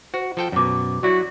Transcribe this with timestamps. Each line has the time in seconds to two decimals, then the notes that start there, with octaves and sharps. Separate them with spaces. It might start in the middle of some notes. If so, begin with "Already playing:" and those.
0.14 F#4 C5
0.37 F3 A4 G5
0.52 F#2 B2 C#5 D6
1.03 F#3 E4 F#4 D5